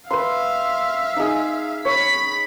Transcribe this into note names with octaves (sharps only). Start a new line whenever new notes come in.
B4 E5 F5 C6
D#4 G#4
C#5 B5 B6